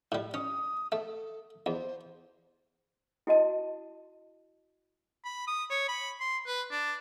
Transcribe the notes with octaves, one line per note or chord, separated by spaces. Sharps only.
A2 G3
C#4 D#6
A3 A4
E2 C5
E4 F#4 D#5 A5
B5
D#6
C#5
B5
C6
B4
D4